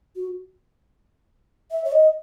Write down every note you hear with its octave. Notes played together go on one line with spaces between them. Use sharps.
F#4
E5
C#5
D#5